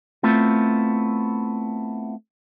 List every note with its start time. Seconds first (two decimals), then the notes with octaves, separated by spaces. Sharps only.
0.23 A3 B3 C4 E4 F4